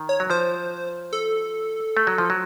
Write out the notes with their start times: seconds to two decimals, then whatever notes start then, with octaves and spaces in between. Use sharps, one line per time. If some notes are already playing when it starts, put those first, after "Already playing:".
Already playing: D#3
0.09 C#5
0.20 F#3
0.30 F3 C5
1.13 A4
1.97 A3
2.07 F#3
2.18 F3
2.30 F#3